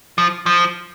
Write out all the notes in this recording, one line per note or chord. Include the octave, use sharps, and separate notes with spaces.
F3
F3